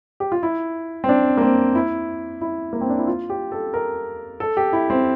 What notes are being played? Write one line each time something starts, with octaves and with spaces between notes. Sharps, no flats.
G4
F4
E4
C4
D4
A#3
C4
E4
E4
A#3
C4
D4
E4
F4
G4
A4
A#4
A4
G4
E4
C4